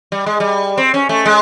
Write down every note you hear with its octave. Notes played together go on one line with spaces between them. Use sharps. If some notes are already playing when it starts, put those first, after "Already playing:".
G3
G#3
G3
C4
C#4
A3
G#3